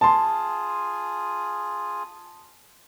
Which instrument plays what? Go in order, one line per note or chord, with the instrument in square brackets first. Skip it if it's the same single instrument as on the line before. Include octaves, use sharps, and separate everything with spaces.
[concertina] F4 G#4 [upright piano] A5 C6